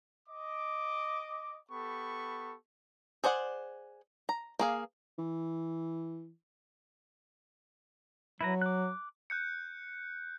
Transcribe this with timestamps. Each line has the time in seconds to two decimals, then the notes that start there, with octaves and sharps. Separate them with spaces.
0.29 D#5 D6
1.71 B3 G4 A4 B5 C#6
3.24 G#4 C5 D5 F#5
4.29 A#5
4.59 A#3 G#4 F5
5.19 E3
8.41 F#3 E4 B4 A#5
8.62 D6 F#6
9.30 F#6 G6 C#7